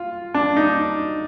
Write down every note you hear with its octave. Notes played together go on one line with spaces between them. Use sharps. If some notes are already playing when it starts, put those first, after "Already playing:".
Already playing: F4
D4
D#4